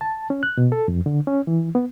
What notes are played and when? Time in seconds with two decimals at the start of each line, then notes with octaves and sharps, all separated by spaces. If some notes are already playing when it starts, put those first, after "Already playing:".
0.01 A5
0.30 C#4
0.43 F#6
0.57 B2
0.72 A4
0.88 F2
1.06 D3
1.27 C#4
1.47 E3
1.75 B3